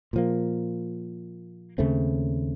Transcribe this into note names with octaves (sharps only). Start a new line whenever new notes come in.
A#2 F3 A#3
D#2 C#3 A3 C4